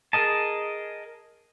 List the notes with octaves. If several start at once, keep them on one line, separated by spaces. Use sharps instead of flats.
G#4 A#4 D#5 A5